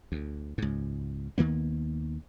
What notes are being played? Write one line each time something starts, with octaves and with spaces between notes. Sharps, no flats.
D2
C#2 G#2
D#2 D#3 A#3 B3